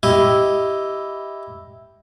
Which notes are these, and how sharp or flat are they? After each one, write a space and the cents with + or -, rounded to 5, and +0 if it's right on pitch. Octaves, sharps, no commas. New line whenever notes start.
E4 +0 G4 +0 D#5 +0